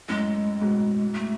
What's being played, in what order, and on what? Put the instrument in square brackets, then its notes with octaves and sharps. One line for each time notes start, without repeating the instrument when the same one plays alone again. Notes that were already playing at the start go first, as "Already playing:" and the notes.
[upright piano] F#2 A2 [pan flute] G#3
[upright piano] G#2 B2
[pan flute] A3